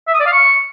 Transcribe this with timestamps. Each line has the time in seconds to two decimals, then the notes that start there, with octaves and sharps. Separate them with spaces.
0.08 E5
0.14 D#6
0.20 D5
0.26 F5
0.33 C#6